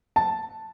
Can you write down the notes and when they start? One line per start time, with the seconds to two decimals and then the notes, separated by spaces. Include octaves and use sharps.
0.16 A5